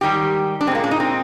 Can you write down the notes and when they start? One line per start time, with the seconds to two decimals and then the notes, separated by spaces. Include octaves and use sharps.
0.01 G#2 D#3 G3 G4
0.61 D4
0.67 G#3 C4
0.71 A#2 A#3
0.84 D4
0.91 D#4
1.00 C4